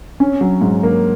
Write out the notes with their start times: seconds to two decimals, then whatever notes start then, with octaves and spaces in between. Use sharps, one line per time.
0.20 C#4
0.41 F#3
0.61 G#2
0.83 A#3